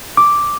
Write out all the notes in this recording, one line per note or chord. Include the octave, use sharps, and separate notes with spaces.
D6